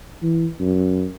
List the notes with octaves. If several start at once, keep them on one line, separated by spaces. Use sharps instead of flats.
E3
F#2